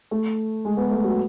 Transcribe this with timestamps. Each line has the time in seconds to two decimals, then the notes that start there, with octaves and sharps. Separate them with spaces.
0.11 A3
0.65 G#3
0.77 B3
0.91 A3
1.04 F#3